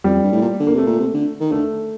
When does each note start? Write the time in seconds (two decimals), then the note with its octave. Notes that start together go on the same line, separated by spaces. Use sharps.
0.04 F2 G3
0.14 F2
0.23 G2
0.32 A2
0.41 A#2
0.60 D3
0.67 A#3
0.74 C3 A3
0.86 A#2
1.00 C3
1.14 D3
1.40 D#3
1.52 D3 A3